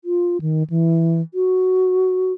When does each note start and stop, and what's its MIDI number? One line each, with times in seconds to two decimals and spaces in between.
0.05 0.37 65
0.41 0.63 51
0.70 1.21 52
1.34 2.33 66